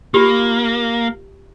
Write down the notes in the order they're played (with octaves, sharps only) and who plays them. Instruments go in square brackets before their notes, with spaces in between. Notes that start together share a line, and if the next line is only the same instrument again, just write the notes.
[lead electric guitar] A#3 [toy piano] F4 G4